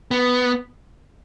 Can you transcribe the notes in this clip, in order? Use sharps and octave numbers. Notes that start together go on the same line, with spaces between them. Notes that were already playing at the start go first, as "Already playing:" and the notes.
B3